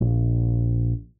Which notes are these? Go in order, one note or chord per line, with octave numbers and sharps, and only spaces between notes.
A#1